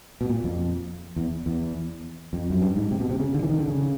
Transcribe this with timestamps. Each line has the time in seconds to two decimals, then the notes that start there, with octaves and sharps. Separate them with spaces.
0.21 B2
0.29 A#2
0.44 F2
1.16 E2
1.46 E2
2.33 F2
2.50 F#2
2.62 G2
2.76 G#2
2.91 C3
3.00 B2
3.10 C3
3.20 C#3
3.34 D3
3.42 E3
3.49 D#3
3.59 D3
3.68 C#3